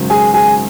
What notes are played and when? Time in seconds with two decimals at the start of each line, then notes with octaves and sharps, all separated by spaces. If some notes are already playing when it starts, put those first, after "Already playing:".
Already playing: G#1 F#2 C#3 F#3
0.10 G#4 G#5
0.34 G#4 G#5